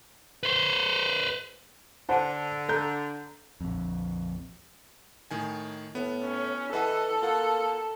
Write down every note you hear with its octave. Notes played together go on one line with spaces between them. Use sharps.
B4 C5
D3 C5 F#5 A5
A4 A#5 G6
A#1 F2
A2 D#3 G#5
A2 B3
C#4
E3 A4 B4 D#5 F#5
A#3 F4 F#5